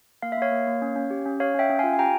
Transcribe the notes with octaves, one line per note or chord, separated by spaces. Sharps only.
A#3 F5
E5
A#3 C#5 F5
A#3
A#3
C#4
C#4
G4
C#4
C#4 C#5 F5
C#4 E5 G5
C#4
F4 F5 G#5
G#5
G4 G5 A#5